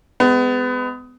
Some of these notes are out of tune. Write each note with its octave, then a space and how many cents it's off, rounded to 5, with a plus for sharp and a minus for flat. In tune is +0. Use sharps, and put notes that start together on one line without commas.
G#3 +0 B3 +30